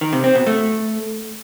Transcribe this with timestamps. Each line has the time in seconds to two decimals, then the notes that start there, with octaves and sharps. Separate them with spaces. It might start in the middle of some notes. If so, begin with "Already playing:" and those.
0.01 D#3
0.13 C3
0.24 C4
0.35 B2
0.47 A3